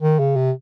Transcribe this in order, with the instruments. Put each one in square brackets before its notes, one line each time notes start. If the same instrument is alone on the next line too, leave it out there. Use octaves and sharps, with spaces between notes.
[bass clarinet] D#3
C#3
C3